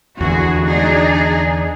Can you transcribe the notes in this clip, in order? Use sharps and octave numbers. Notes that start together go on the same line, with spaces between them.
E2 D3 F#4 G#4
D4 D#4 G#4